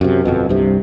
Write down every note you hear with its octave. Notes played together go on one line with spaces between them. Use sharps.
F#2 C3
G1 F2 B2
C2 G2 C3